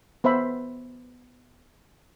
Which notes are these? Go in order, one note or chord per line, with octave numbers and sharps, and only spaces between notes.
B3 C5 E5 B5